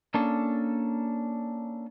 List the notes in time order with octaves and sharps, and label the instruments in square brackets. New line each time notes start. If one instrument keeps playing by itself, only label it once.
[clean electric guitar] A#3 C#4 D4 A4